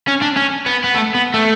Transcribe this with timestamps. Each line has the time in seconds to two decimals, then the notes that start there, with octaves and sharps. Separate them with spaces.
0.08 C#4
0.22 D4
0.37 C#4
0.66 B3
0.84 B3
0.94 A3
1.15 B3
1.34 A3